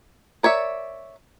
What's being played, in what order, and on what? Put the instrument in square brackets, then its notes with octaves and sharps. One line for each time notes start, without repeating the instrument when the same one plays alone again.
[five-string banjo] A#4 C#5 D5 E5